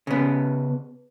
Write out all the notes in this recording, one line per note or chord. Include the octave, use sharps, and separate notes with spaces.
C#3 B3